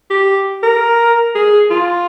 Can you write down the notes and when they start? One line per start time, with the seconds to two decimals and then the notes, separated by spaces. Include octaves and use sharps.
0.10 G4
0.63 A#4
1.35 G#4
1.71 F4